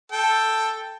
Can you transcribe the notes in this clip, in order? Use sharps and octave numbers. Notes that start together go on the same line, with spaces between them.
A4 G5